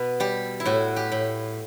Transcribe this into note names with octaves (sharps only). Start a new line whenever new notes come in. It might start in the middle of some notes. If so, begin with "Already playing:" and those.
Already playing: B2 B4
G3 G4
E4
A2 F#4
G4
A2